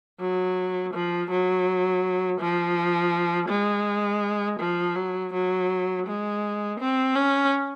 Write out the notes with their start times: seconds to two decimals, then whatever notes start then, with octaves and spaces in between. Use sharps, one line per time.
0.20 F#3
0.93 F3
1.30 F#3
2.40 F3
3.49 G#3
4.60 F3
4.95 F#3
5.33 F#3
6.06 G#3
6.79 C4
7.15 C#4